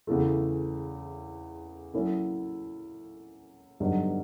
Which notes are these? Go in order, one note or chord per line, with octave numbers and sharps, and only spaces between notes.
E2 C#3 E3 A3
F#3 A#3 C#4 E4 A4
G2 D3 F#3 B3 D#4